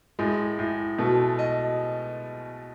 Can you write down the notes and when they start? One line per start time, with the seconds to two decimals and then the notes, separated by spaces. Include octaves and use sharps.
0.19 A2 G#3
0.59 A2
0.98 B2 A3
1.39 D#5